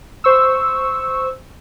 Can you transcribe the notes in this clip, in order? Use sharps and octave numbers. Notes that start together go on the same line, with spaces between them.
C5 C#6 E6